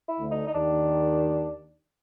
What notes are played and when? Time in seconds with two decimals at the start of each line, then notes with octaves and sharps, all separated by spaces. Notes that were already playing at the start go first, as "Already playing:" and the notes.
0.09 E4
0.19 D2 D3
0.31 D#4
0.47 D#4
0.54 D#2 D#3 D4